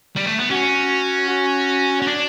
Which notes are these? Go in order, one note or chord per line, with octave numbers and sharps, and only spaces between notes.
G3
A3
B3
C#4 F#4
F#4
C#4
D4